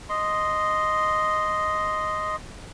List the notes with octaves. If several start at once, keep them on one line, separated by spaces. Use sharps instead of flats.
D#5 C6